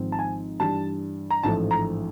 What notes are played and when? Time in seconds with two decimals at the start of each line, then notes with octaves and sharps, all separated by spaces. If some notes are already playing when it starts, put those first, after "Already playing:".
Already playing: G#1 G#2 F3 G#3 C4
0.12 A5
0.19 G#5
0.60 G2 E3 G3 A5
1.31 A#5
1.43 A1 G#2 F3 A3 A5
1.71 A#5